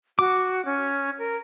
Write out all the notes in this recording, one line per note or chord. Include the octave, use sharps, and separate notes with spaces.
F#4 D6
C#4
A#4